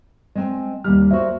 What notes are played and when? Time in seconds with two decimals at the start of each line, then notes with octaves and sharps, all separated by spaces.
0.35 G#3 C4 G#5
0.84 D#2 G3 F6
1.11 A#3 F#4 C5 E5